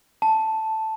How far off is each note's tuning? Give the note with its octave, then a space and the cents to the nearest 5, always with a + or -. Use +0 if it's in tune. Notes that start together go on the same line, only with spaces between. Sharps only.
A5 +0